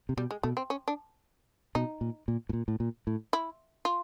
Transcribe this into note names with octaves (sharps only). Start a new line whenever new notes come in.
C3
B2 G3
G#3
B2 A3
C4
C#4
D4
B2 D#4
A#2
A#2
A2
A#2
A2
A#2
A2
E4
F4